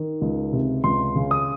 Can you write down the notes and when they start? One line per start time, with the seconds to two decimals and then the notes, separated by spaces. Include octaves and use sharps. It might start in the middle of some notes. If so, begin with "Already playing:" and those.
Already playing: D#3
0.21 C#2
0.53 C3
0.84 C#2 C6
1.15 C#3
1.31 D#6